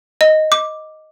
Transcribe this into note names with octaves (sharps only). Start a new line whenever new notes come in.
D#5
D6